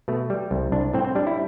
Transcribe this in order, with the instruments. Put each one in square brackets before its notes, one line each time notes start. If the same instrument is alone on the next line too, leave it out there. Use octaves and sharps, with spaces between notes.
[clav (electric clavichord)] B2 A3
G3
C2
C2 D4
A2 C4
C4
G3 D4
E4